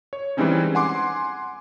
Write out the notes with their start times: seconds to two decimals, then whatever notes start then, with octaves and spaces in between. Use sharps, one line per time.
0.13 C#5
0.37 E3 G3 G#3 C4 C#4 D#4
0.75 F#5 G#5 C6 D6